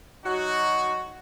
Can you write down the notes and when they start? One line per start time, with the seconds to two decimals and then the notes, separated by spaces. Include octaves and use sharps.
0.24 F#3 D#4 F#4